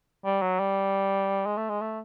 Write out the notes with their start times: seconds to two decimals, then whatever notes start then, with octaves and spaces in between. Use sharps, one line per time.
0.25 G3
0.42 F#3
0.59 G3
1.46 G#3
1.57 A3
1.70 G#3
1.81 A3